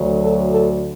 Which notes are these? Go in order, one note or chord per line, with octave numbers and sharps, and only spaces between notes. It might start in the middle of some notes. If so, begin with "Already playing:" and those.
Already playing: D2 D3 F#3
A4
A4